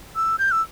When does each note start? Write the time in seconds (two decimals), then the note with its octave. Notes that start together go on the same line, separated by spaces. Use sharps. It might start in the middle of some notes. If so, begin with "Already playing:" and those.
0.16 E6
0.39 G6
0.52 E6